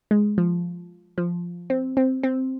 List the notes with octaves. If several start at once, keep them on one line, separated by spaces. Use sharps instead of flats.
G#3
F3
F3
C4
C4
C4